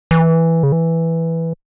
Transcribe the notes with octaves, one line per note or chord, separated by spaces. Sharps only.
E3
C#3
E3